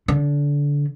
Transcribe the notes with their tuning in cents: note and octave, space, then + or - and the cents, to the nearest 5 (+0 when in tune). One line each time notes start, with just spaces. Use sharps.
D3 -25